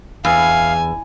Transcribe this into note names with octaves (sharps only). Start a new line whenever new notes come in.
E2 F5 G#5